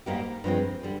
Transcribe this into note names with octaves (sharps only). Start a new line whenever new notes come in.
G#2 G3 A#3 D#4 G4
G2 F3 G#3 C4
D3 G3